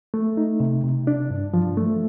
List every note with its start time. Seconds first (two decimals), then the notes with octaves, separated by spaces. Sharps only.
0.14 A3
0.37 D#4
0.60 C3
0.84 C3
1.07 D4
1.31 G2
1.54 F3
1.77 A3